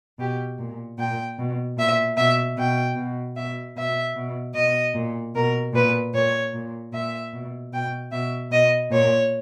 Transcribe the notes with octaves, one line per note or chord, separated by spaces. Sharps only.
B2 G4
A#2
A#2 G5
B2
A#2 E5
B2 E5
B2 G5
B2
B2 E5
B2 E5
B2
B2 D#5
A#2
B2 A#4
A#2 B4
A#2 C#5
A#2
A#2 E5
B2
B2 G5
B2 E5
B2 D#5
A#2 C#5